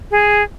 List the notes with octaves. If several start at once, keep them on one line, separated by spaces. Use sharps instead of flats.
G#4